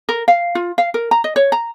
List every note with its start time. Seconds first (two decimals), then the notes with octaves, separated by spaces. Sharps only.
0.09 A#4
0.28 F5
0.55 F4
0.78 F5
0.94 A#4
1.11 A#5
1.24 D#5
1.36 C#5
1.52 A#5